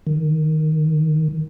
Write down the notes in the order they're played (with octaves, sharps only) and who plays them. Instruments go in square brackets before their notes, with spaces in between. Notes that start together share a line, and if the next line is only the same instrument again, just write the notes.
[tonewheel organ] D#3